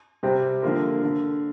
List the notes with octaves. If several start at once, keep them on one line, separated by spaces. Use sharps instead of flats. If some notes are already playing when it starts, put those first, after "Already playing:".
C3 G3 C4 G4
D3 F3 A#3 F4 A#4
D3